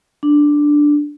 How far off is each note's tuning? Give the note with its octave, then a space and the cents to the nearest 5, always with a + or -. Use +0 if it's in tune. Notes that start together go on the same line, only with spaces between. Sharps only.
D4 +0